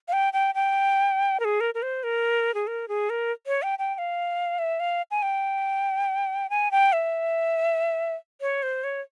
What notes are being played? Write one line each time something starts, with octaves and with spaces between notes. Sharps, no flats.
F5
G5
G5
G5
A#4
G#4
A#4
A#4
C5
A#4
G#4
A#4
G#4
A#4
C#5
G5
G5
G5
F5
E5
F5
G#5
G5
G#5
G5
E5
C#5
C5
C#5